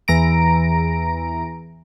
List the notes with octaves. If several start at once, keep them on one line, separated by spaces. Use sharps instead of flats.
E2 A#5 D7